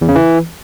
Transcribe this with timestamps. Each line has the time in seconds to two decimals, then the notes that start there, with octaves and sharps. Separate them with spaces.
0.01 E2
0.08 C#3
0.15 E3